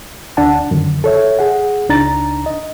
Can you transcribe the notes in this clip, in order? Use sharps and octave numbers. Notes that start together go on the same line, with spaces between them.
D2 D4 F#5 A5
F#2 D3 D#3
A4 C#5 E5
G#4 F#5
C#2 D4 D#4 A#5 A6
D#5